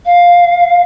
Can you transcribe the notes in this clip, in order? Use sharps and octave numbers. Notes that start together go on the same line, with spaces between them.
F5